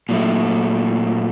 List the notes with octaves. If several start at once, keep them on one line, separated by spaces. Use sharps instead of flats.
A#2 F#3 A3